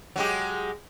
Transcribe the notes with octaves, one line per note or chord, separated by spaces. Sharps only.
F#3 G#3 G4